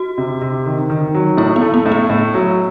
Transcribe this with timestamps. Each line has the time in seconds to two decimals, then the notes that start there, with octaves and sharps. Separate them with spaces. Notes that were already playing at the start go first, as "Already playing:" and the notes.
Already playing: F#4
0.18 C3
0.42 C3
0.66 D#3
0.90 D#3
1.15 F#3
1.37 A2 E4
1.56 B3
1.61 A3
1.74 B3
1.86 A2
1.92 B3
2.10 A2
2.34 F#3